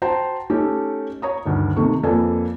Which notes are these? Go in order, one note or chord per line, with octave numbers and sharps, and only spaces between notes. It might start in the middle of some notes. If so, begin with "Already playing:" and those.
F#4 C5 G5 A5 A#5
A3 C#4 D#4 G4 A4
C#5 A#5 D#6
D2 G2 D#3
C3 D#3 A3 C#6
F2 A#3 A4 B4 D5 G#5